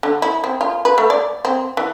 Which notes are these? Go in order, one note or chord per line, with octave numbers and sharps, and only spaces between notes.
D3
E4
C4
F4
B4
A3
D5
C4
E3